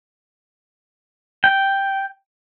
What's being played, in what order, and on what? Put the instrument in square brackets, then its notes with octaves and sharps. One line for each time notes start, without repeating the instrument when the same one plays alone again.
[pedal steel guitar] G5